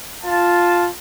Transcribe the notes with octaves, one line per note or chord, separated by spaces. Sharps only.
F4 A5